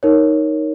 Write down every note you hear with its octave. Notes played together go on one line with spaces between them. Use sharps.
D#4 A#4 C#5